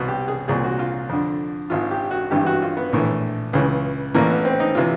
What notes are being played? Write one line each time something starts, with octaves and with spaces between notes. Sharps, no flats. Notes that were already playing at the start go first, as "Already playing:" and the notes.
Already playing: C2 B2 F#4
G4
G#4
C2 A#2 G#4
F#4
F4
F2 D3
G#1 G#2 D#3 F4
G4
F#4
G#1 G2 E3 G4
F#4
F4
B3
A#1 A2 E3
C#2 C#3 E3
A1 A2 E3 A#3
B3
C4
D#4
C3 E3 F4